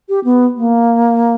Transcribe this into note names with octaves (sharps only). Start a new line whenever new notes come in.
G4
B3
A#3